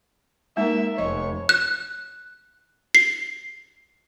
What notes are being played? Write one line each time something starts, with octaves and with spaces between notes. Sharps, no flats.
G#3 A#3 D#4 A#4 E5
F1 C#5 D#5
F#6
C7